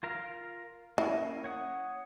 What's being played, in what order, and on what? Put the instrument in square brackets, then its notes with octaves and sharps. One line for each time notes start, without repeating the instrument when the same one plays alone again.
[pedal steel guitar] F4 A#4 F5
[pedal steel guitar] A#3 C#4 [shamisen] E4
[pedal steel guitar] C#5 F#5 D#6